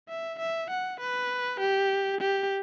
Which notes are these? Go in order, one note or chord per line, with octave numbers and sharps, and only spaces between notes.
E5
E5
F#5
B4
G4
G4